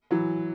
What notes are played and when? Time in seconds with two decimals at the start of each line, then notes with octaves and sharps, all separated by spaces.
0.11 E3 F#3